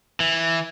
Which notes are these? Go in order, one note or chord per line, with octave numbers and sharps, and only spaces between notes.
E3